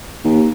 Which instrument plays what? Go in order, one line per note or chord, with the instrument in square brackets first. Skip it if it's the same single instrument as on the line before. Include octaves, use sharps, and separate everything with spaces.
[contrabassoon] D#2